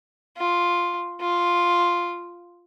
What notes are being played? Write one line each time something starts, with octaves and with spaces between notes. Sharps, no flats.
F4
F4